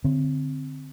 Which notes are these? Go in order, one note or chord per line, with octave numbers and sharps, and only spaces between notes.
D3 C4